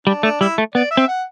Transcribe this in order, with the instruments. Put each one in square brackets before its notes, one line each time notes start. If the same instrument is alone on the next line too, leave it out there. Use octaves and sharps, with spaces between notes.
[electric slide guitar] G3 [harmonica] D4
[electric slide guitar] A3 [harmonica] D4
[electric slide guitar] G3 [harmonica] E4
[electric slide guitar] A3
[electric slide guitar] B3 [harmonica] D5
[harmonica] E5
[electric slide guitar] C4
[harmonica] F#5